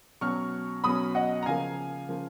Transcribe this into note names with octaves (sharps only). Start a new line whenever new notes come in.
B2 F#3 C#4 C#6 F6
B2 F#3 C#4 B5 D#6
D#5 F#5
A#5
C#3 F3 A#3 F5 G#5
C#3 F3 A#3